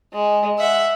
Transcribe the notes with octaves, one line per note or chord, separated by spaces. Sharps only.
G#3
E5 F#5